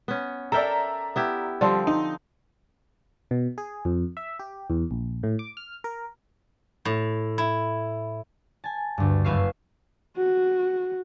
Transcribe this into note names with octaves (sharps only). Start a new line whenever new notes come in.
B3 C#4
A4 A#4 D5 E5 G5 A#5
B3 E4 G4
D3 F3 G3 C4
D#4
B2
G#4
F2
E5
G4
E2
A#1
A2
D6
F6
A#4
A2
E4
G#5 A5
D2 G2
F#1 B4 E5 F5 C#6 C7
F#4